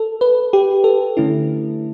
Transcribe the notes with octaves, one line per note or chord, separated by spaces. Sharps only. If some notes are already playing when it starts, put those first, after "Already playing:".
Already playing: A4
B4
G4
A4
D3 A3 C#4 E4